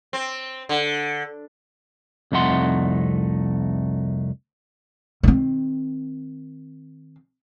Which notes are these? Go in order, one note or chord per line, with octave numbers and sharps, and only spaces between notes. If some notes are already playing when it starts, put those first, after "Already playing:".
C4
D3
C2 F2 A3 D#4 F#5 C6
D#3 C4